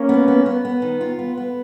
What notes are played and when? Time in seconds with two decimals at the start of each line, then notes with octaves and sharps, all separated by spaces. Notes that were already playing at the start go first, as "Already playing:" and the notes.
Already playing: A#3 C#4
0.09 B3
0.28 B3
0.46 B3
0.65 B3
0.82 D#3
1.01 F4
1.19 B3
1.37 B3